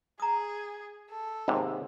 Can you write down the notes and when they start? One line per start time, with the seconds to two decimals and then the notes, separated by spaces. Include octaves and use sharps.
0.20 G#4 A#5 D#6
1.10 A4
1.48 D#2 G#2 C3